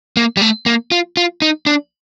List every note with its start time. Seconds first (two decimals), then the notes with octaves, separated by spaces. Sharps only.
0.17 A#3
0.37 G3
0.42 A3
0.66 A#3
0.92 F4
1.17 F4
1.42 D#4
1.66 D4